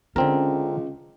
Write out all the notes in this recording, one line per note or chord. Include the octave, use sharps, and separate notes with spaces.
C#2 D3 C4 C#4 A#4